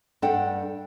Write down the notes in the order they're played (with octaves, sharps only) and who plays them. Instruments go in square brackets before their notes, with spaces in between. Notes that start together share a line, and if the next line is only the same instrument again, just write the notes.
[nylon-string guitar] G2 D4 A4 F#5 G5